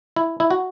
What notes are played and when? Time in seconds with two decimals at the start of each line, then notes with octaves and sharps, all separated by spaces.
0.16 E4
0.40 E4
0.50 F#4